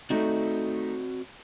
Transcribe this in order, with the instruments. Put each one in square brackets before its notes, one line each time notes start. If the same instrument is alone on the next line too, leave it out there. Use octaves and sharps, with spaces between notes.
[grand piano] A3 D#4 [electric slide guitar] C4 F#4 D5